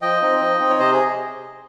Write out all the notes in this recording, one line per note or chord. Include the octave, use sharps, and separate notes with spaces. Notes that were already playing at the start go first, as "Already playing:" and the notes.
F3 D#5 G5
C4 D#4
F3
C4 D#4
C#5
C3 C5 D#5
G#4